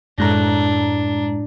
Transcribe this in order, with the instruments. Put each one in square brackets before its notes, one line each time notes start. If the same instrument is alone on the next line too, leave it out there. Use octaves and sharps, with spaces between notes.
[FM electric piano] F#2 G#3 A#5 [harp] A2 F#6 A#6 [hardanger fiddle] D4